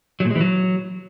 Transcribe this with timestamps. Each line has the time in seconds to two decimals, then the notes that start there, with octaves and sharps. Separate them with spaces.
0.20 F#3
0.25 A#2
0.30 G#3
0.35 E3
0.41 F#3